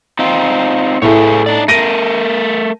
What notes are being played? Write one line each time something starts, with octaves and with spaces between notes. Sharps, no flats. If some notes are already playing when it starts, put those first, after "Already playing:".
C4 D#4 F4
A2 A3 G#4 B4 C#5
D4 D#4 D5
A3 A#4 A#6 D7 D#7